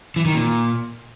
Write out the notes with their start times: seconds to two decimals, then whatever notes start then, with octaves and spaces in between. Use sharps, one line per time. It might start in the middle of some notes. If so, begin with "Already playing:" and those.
0.16 E3
0.25 D#3
0.35 A#2